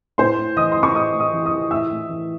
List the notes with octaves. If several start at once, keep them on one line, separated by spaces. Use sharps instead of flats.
A2 C5 C6
A2
E3 D#5 D#6
E3 C6
C#6
A2 D#5 D#6
A2
D#5 D#6
E3
D#5 D#6
E3
A2 E5 E6
A2
E3